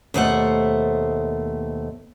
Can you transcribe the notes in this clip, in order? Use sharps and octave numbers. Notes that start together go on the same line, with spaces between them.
D#2 B2 A3 C5 E5 F#5